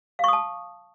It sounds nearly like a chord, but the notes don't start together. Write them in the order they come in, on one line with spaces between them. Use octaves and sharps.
F5 C#6 D#6 A5